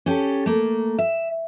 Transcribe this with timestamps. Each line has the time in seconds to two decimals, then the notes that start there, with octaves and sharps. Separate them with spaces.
0.06 C#4 G4 A4
0.46 A3 A#3
0.99 E5